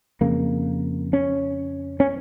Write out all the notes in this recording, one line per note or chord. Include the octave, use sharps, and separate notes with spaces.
F2 C#3 A#3
C#4
C#4